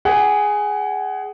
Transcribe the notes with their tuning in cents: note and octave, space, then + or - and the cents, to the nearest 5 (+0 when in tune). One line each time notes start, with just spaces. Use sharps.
G#4 +0 F#5 +30